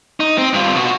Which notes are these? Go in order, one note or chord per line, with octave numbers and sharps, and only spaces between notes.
D#4
C4
G2 F4
B2 F#4